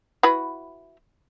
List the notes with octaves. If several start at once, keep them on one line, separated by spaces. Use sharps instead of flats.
E4 F#4 B4